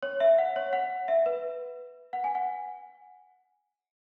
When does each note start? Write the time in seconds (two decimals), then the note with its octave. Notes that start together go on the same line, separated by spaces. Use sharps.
0.03 C#5
0.20 E5
0.38 F#5
0.56 C#5
0.73 F#5
1.08 E5
1.26 B4
2.13 F#5
2.24 G#5
2.35 F#5